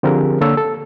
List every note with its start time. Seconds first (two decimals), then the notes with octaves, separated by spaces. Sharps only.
0.03 D3 F3 C4 G4 G#4 A#4
0.41 D3 A#3 A4 C#5 E6
0.57 A4